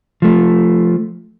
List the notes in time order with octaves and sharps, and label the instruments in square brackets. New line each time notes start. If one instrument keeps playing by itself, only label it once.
[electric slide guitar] F3 A3